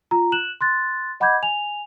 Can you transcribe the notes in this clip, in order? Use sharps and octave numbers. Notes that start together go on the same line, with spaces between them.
F4 A#5
F#6 E7 F#7
C6 F#6 A6
D#5 F#5 B5 D6 G6 G#6
G#5 F7